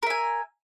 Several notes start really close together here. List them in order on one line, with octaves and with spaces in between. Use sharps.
A#4 E5 G#5